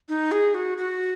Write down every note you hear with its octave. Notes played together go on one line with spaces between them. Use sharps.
D#4
G#4
F#4
F#4